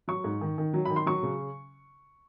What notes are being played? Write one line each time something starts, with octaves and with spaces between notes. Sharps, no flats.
F#3 C#6
G#2
D#3
D#3
F#3
D#3 B5
C6
F#3 C#6
C#3